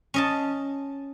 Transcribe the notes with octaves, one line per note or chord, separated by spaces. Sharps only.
C#4 D#5 A5